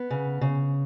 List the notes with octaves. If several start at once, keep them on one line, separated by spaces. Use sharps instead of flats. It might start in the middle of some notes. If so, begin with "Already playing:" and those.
Already playing: B3
C#3
C#3